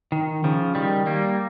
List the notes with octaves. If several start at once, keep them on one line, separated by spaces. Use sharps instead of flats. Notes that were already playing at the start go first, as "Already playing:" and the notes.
D#3
C#3 F3
D#3 G3
G3 A#3